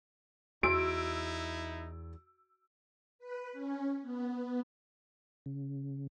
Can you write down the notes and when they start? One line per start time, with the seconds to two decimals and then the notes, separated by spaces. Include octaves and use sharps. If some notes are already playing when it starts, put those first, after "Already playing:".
0.63 E2 D#4 E4 F#4 E6 D7
3.19 B4
3.53 C#4
4.02 B3
5.46 C#3